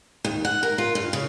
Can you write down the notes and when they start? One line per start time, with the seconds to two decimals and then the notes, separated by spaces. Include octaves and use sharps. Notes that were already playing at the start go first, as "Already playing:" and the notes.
0.25 D#2
0.45 F#5
0.63 A#4
0.78 F4
0.95 G2
1.13 C#3